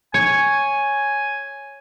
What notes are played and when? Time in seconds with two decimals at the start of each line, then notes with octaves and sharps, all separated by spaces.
0.14 C#5 G#5